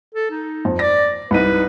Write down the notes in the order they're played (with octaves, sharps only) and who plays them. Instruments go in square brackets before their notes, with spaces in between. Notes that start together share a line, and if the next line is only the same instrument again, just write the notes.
[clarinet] A4
D#4
[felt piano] F2
[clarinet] D5 [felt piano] A#6
[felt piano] C2 D#4 D#7 [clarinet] B4